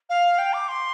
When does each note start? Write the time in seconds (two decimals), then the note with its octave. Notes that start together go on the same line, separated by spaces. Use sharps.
0.10 F5
0.38 G5
0.53 D6
0.68 C6